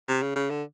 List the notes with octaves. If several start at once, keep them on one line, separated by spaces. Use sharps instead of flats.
C3
C#3
C#3
D3